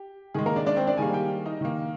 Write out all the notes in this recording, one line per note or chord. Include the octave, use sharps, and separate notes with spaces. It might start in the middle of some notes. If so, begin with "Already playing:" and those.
Already playing: G4
D#3 G#3 G#4
A#3 A#4
D4 D5
D4 D5
C4 C5
D4 D5
D#3 G3 A#3 G#4 G#5
G4 G5
D#4 D#5
D#3 A#3